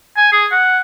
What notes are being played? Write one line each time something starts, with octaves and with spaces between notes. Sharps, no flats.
G#5
G#4
F#5